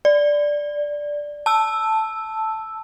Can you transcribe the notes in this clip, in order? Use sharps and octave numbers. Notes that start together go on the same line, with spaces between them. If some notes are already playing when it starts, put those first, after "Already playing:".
D5
A5 E6